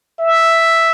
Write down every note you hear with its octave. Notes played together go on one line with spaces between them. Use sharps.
E5